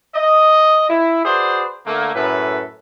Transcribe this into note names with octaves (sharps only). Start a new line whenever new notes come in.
D#5
E4
F#4 G#4 B4 C5 D5
D3 A3 A#3
F#2 A2 A4 B4